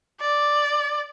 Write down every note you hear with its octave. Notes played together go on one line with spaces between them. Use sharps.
D5